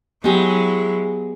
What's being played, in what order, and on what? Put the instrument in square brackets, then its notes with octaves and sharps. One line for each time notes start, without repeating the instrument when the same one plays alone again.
[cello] F#3 E4 [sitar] G#3 [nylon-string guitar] B3 G4 G#4